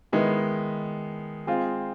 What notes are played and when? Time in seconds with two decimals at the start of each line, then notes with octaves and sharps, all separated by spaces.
0.12 D#3 G#3 B3 E4
1.47 G#3 C4 F4 G#4